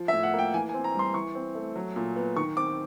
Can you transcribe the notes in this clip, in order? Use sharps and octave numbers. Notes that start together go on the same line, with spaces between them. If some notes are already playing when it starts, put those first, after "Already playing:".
Already playing: F3
E5
A2
F#5
A#3 G5
E3 G#5
G#5
C4
A#5
G3
C6
E3 C#6
C4
A3
F#3
A#2
B3
D#3 C#6
C4 D6